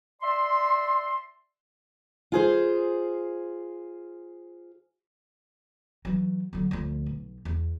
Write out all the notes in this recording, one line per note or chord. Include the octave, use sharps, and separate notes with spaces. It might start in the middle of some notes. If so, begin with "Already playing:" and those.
D5 E5 C6
F4 G#4 C5
E3 F#3
D3 F#3
D2 F3
B1
E2